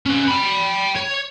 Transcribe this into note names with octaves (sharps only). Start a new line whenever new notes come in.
C#4 B4
G5 B5
C#5